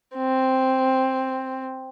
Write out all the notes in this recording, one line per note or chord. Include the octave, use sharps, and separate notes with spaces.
C4